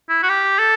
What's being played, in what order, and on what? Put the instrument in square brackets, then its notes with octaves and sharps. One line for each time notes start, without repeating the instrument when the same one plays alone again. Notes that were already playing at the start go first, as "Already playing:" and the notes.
[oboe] E4
F#4
G4
A4